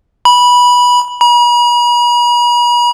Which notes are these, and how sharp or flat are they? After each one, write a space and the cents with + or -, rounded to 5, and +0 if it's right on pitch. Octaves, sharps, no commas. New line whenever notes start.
B5 -15
B5 -45